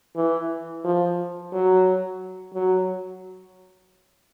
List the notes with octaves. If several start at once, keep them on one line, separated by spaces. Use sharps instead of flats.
E3
F3
F#3
F#3